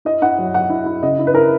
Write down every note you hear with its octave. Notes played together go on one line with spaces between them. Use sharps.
E4 D#5
E4 F#5
F#3
F#3 F#5
E4
E4
C#3 D#5
E4
B4
E4 A#4